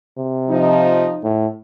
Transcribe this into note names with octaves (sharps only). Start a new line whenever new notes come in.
C3
F3 D#4
A2